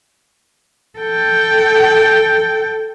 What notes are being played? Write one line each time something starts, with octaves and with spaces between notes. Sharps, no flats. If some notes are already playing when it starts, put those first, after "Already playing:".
A4 G5